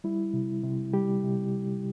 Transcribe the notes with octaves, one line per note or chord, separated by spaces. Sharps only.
G3 E4
C3
C3
G3 G4
C3